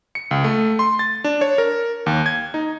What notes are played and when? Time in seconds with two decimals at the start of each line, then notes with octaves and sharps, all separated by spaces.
0.15 C#7
0.31 C#2
0.44 A3
0.79 C6
0.99 A6
1.24 D4
1.41 C#5
1.58 A#4
2.06 D#2
2.26 G#6
2.54 D#4